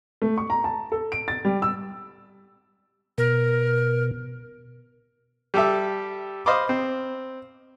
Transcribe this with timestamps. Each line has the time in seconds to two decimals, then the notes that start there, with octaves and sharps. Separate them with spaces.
0.22 A3
0.38 C#6
0.50 A#5
0.64 A5
0.92 A4
1.12 D7
1.28 A6
1.45 G3
1.62 E6
3.18 B2 A#4
5.54 G3 G4 A4 E5
6.46 C5 D#5 F5 B5 C6 D6
6.69 C4